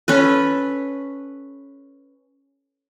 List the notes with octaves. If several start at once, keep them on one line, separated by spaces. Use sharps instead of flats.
C#4 A4 B4